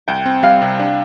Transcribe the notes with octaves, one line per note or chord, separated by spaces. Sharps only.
C2 G5
C4
G3 F5
C3
D4